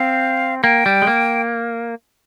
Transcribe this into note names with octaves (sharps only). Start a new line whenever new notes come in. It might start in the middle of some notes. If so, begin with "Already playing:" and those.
Already playing: C4 F5
A#3 G5
G3
G#3
A#3